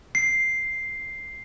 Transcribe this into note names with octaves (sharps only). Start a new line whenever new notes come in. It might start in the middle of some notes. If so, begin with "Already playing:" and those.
C7